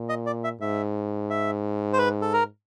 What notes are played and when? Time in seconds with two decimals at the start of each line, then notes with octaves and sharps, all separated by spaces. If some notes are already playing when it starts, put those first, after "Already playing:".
Already playing: A#2
0.09 D#5
0.27 D5
0.44 E5
0.61 G#2 E5
1.30 E5
1.93 C5
1.98 B4
2.22 A4
2.33 A#4